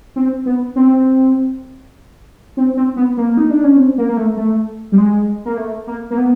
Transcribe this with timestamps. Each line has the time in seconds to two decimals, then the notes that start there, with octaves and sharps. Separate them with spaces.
0.16 C4
0.46 B3
0.76 C4
2.57 C4
2.77 C4
2.96 B3
3.17 A#3
3.37 D#4
3.50 D4
3.64 C#4
3.76 C4
3.98 A#3
4.08 A#3
4.17 A3
4.37 A3
4.92 G3
4.98 G#3
5.45 A#3
5.57 A3
5.87 A#3
6.10 A#3
6.17 B3